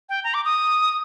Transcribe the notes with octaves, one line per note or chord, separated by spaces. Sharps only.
G5
A#5
D6
D#6